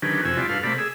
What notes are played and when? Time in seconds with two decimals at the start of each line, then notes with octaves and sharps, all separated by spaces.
0.02 D3 D#3 F#3 C#4 G4 B4
0.25 F2 C3 F#4 G#5 E6
0.37 G3 E4 F4 D5
0.49 G2 F#4 A4 B4 F5 F6
0.63 C3 A3 A#3 D5 B5
0.78 G#4 E6